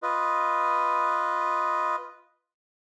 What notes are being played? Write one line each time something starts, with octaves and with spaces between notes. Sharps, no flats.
F4 B4 D#5